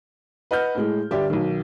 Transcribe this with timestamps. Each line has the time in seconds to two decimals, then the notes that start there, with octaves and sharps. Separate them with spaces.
0.51 B4 D#5 F#5 F6 G6
0.75 A2 G#3
1.11 G1 G4 D5 E5
1.30 B1 D#3